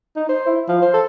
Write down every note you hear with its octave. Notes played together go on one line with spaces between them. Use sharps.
D#4
C5
E4
F3
C5
A4